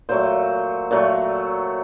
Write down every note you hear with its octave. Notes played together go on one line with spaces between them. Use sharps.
A#2 F#3 A3 C5
A#2 F#3 A3